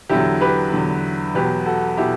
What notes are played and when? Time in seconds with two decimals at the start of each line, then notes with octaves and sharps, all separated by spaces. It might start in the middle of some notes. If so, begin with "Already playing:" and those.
0.09 E2 D3 F#3 E4 G4
0.41 G4 B4
0.73 E2 D3 F#3
1.35 E2 B2 F#3 G4 B4
1.66 F#4 A4
1.97 B2 E4 G4